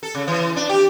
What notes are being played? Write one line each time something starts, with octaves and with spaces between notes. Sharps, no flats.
A4
C#3
E3
D4
G4